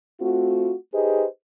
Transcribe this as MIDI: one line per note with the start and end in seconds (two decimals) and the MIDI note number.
0.20 0.74 57
0.20 0.74 60
0.20 0.74 65
0.20 0.74 66
0.94 1.26 63
0.94 1.26 67
0.94 1.26 68
0.94 1.26 71
0.94 1.26 72
0.94 1.26 75